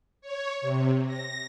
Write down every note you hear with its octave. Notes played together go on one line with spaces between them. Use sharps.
C#5
C3
A#6